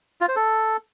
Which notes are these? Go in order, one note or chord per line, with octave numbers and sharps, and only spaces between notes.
F4
C5
A4